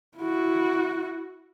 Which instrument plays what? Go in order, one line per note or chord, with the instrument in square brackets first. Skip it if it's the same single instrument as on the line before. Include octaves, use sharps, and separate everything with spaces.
[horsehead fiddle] E4 F#4